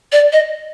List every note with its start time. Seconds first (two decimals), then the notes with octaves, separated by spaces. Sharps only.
0.12 D5
0.32 D#5